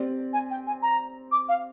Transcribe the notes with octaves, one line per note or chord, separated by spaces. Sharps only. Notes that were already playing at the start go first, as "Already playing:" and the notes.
Already playing: C4 G4 D5
G#5
G5
G#5
A#5
D6
F5